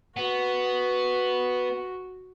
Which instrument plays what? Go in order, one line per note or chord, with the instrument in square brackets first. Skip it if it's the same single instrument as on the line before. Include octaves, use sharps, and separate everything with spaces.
[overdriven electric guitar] B3 [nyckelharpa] F#4